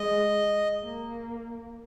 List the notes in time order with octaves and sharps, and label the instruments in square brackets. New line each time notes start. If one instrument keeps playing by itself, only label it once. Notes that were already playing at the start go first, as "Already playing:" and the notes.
Already playing: [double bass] G#3 [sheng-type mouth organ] D#5
[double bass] A#3